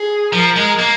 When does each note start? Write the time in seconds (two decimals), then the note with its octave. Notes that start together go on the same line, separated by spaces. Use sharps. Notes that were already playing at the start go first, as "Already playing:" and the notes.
Already playing: G#4
0.33 F3 A#4
0.56 G#3
0.79 A#3